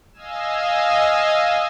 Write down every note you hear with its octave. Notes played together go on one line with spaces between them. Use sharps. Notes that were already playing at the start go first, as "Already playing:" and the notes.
D#5 F5 G#5 E6